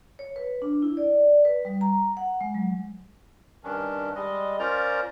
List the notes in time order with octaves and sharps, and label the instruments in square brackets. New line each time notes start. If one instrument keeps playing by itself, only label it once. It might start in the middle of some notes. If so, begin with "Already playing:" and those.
[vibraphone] C#5
B4
D4
E4
D5
B4
G3
A#5
F#5
G#3
F#3
[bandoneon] G2 D#3 C#4 D4
G3 G#3 D#5
C#4 F4 A#4 C5 D5 A#5